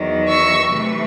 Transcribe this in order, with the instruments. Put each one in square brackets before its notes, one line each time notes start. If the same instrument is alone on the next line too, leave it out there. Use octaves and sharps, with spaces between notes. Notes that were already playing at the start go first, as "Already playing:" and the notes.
Already playing: [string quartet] E2 D#3 F#3
C#6 E6
C3 E3 A3